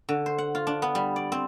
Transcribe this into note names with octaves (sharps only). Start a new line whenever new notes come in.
D3
C5
F#5
F4
D4
B3
G3
D5
C4